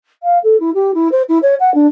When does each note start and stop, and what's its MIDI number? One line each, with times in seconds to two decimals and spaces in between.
0.22 0.38 77
0.43 0.59 69
0.60 0.70 64
0.74 0.91 67
0.94 1.08 64
1.11 1.22 72
1.28 1.38 64
1.42 1.55 73
1.60 1.73 78
1.74 1.86 62